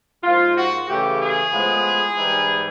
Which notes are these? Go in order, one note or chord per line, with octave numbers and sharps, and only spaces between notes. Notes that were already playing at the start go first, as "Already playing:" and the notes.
G#2 F3 A#3 F4
F#4
C#3 E3 A3 G4
G#4
A2 F3 G#3 B3
G#2 E3 G3